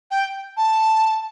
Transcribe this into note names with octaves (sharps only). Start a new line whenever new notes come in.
G5
A5